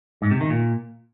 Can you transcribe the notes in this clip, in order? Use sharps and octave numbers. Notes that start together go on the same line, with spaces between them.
G#2
C3
D#3
A#2